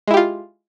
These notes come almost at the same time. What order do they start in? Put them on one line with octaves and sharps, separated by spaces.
G#3 E4 G4 F4